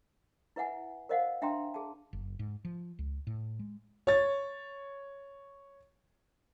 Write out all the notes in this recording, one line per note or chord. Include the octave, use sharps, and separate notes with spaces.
E4 B4 E5 F#5 G#5
A#4 C5 D#5 F5 F#5
D4 E5 G5 A#5 C6
G#4 A5
F#1
G#2
F3
C#2
A2
G#3
C#5 A6